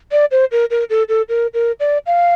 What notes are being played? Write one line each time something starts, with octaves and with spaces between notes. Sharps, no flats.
D5
C5
A#4
A#4
A4
A4
A#4
A#4
D5
F5